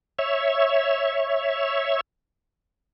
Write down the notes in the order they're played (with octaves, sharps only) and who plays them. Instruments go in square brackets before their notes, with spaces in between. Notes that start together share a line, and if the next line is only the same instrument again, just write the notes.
[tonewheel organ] C#5 E5